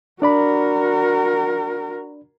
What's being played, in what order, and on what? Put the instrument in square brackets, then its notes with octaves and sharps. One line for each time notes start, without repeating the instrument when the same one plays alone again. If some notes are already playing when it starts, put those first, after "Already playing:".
[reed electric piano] D4 D5 B5 [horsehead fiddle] F#4 A#4